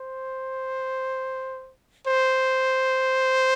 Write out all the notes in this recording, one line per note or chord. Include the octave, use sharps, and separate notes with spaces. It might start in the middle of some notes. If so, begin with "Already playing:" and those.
Already playing: C5
C5